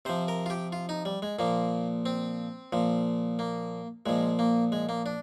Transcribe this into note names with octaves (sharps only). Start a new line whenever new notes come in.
C3 F3 C5
A#4
F4
G4
F4
D#4
G3
G#3
A#2 F3 A#3
C4
A#2 F3
A#3
A#2 F3 G#3
A#3
G#3
A#3
D4